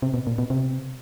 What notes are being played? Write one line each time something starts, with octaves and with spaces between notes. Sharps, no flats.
C3
B2
A#2
B2
C3